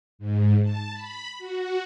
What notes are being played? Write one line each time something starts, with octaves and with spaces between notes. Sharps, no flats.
G#2
A5
B5
F#4